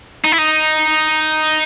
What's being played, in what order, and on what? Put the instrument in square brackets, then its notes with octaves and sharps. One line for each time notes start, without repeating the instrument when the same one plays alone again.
[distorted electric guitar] D#4
E4
D#4